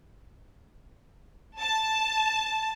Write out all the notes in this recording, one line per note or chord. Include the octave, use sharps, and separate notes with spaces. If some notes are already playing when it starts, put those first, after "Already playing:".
A5